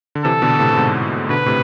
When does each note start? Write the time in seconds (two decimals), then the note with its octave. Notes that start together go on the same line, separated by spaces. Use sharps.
0.15 D3
0.24 C3 E3 A4
0.42 B2 D3
0.59 A2 C3
0.73 C3
0.77 G#2 B2
1.29 B2 D3 B4
1.46 A2 C3